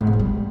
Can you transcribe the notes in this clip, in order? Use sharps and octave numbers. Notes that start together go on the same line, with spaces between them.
G#2
B2
F#3
G3